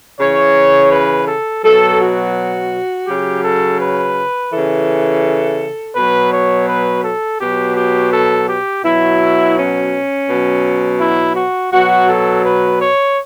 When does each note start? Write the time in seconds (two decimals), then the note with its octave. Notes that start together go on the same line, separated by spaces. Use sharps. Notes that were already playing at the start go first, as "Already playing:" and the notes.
0.19 C#3 E3 C#5
0.91 B4
1.27 A4
1.64 B2 F#3 A4
2.00 F#4
3.07 C#3 F#3 G4
3.44 A4
3.80 B4
4.51 C#3 E3 A4
5.95 B2 F#3 B4
6.33 C#5
6.68 B4
7.04 A4
7.40 B2 F#3 G4
7.77 G4
8.12 A4
8.48 G4
8.84 B2 F#3 E4
9.57 C#4
10.28 B2 F#3
11.00 E4
11.36 F#4
11.72 B2 F#3 F#4
12.09 A4
12.45 B4
12.81 C#5